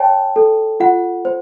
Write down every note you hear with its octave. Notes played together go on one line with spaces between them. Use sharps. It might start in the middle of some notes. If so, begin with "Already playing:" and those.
Already playing: C#5 G5 A5
A4
F4 F#5
C5